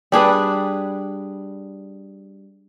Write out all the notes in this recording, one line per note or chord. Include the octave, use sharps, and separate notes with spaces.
G3 D4 G#4 B4